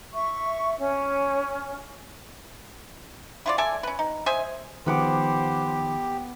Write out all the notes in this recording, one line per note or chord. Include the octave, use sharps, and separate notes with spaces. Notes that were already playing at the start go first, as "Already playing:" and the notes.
E5 C#6
C#4
E4 F4 D5
A4 D5 E5 G#5
C#4 B4
D#4
C5 D#5 E5 G#5
D#3 F3 B3 G4 C5 F#5 D6